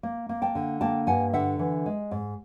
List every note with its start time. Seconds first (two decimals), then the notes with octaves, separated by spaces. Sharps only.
0.03 A#3
0.29 A#3
0.42 G5 A5
0.55 D3
0.81 A#3 G5 A5
1.07 G2 F#5 G#5
1.33 D3 E5 F#5
1.59 E3
1.86 G#3
2.11 G#2